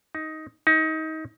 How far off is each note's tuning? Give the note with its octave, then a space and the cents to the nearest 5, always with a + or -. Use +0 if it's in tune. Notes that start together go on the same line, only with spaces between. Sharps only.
D#4 +10
D#4 +25